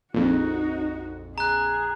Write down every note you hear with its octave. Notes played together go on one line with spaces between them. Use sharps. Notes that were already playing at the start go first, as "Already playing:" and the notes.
A#1 F2 D#4 F#4
G#4 A#5 F#6